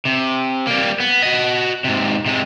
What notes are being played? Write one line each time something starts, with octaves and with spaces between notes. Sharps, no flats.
C3
G3 A#3
B3
F#4 D#5
G#2 C3
C3 G#3